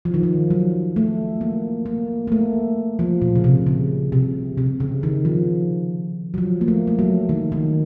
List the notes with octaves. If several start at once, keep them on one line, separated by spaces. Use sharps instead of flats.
F3
D#3
F3
F#3
A3
A#3
A#3
A#3
A3
F3
A#2
C#3
C3
C#3
C3
C3
C#3
D#3
F3
F#3
F3
A#3
A3
A3
F#3
D#3
D#3